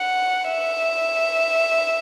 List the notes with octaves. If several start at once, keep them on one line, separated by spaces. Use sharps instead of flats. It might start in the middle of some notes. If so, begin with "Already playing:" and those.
Already playing: F#5
E5